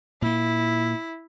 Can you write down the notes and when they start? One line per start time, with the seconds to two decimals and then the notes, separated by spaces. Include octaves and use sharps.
0.22 A#2 A#3 E4